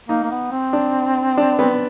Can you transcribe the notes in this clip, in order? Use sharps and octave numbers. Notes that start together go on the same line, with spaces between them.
A#3 D#4
A#3
B3
C4
D4
D4
B3